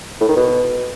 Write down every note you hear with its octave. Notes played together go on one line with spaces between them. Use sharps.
A2
D#3
B2